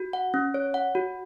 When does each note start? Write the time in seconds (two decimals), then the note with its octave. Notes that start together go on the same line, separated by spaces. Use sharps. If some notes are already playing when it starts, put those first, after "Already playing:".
Already playing: F#4
0.13 F#5
0.34 C#4
0.54 C#5
0.74 F#5
0.95 F#4